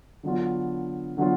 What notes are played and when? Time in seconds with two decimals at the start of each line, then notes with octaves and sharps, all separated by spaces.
0.23 D3 F#3 B3 D4 F4
1.17 D3 F#3 B3 D4 F4